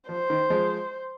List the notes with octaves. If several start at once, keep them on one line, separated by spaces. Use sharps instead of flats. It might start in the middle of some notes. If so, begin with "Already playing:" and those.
F3 C5
D#3
F3 G#3